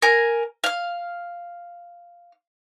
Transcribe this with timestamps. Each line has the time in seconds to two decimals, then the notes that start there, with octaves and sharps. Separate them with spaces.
0.02 A#4 G#5
0.64 F5 F6